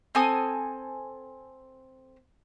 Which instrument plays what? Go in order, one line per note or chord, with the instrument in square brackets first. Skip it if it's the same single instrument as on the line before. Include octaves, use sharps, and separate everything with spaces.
[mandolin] C4 A4 G#5 D#6